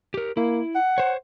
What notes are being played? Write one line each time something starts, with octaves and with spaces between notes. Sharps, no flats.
G4 A#4
A#3 E4
F#5
C5 C#5